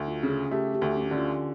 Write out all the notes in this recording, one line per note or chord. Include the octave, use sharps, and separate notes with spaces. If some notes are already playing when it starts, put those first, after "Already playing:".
Already playing: D2
F4
C#3
G#4
A3 G4
G4
D2
C#4
D4
D3 C#4
F4